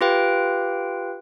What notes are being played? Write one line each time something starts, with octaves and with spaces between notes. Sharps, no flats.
F4 G4 B4 F5 G5